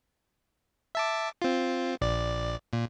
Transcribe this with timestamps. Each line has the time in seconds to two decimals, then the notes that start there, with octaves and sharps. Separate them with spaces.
0.95 E5 A5 D6
1.42 C4 F4
2.01 A#1 D5
2.73 A#2